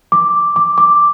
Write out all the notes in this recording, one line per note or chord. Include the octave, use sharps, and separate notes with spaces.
D6
D6
D6